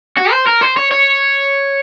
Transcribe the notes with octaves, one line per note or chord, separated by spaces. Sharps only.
F#4
C5
A#4
C5
C#5
C#5